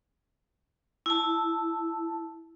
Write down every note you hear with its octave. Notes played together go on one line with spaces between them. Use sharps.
E4 A5